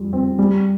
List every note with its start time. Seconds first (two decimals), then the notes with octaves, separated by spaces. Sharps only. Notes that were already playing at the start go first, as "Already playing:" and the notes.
Already playing: F2 G3
0.13 C4
0.39 G3